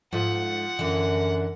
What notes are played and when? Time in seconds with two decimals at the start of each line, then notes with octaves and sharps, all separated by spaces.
0.13 G#2 F3 A3 F4 F#5
0.79 F#2 D3 E3